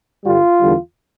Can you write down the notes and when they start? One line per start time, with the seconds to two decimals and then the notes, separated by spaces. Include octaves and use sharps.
0.25 G2 D3 G3 F4
0.61 E2 D3 G3